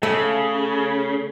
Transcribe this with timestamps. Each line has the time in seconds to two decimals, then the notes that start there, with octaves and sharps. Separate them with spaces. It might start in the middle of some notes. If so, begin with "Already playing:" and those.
0.03 C#3 A3